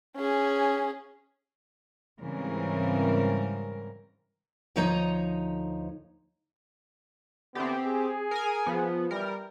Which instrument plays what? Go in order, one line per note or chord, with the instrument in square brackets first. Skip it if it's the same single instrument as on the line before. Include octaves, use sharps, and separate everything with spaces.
[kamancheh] C#4 G#4
[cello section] G#2 C#3 E3 G3 C4 A#4
[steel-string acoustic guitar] D2 F3 D#4 C#5 D#5 A#5
[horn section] D3 E3 B3 [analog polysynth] C4 G4
[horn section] G#4
[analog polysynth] A#4 G#5
F3 B3
[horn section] E3 G3 [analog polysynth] A#4